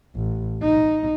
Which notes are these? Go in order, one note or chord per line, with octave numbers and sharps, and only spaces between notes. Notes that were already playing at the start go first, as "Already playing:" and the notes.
A1
D#4